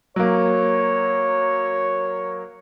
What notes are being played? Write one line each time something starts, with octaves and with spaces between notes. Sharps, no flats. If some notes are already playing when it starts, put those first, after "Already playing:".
F#3 A#3 C#5